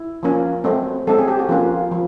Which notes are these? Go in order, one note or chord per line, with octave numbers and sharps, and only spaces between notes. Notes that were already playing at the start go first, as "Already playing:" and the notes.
Already playing: E4
F3 A#3 C#4
F#3 A3 C4
F#3 A3 C4 A4
G#4
G4
F#4
F3 A#3 C#4 F4
F3